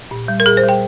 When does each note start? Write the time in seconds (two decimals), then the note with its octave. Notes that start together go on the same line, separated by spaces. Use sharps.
0.11 A#2
0.28 G3
0.40 A#4
0.46 A#2 G#4
0.57 C5
0.63 G3
0.69 G5